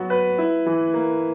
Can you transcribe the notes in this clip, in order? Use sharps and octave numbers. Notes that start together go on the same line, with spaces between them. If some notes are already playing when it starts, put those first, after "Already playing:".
Already playing: F#3 B3 F#4
B4
E4
E3
A#3